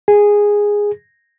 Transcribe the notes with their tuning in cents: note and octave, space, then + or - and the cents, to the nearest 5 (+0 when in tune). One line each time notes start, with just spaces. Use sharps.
G#4 -10